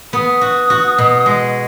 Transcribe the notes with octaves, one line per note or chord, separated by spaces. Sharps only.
B3 D#6
F#4
F#4
B2
G#3